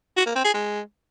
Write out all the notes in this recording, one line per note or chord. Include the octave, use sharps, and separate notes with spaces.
F#4
A#3
C4
G#4
G#3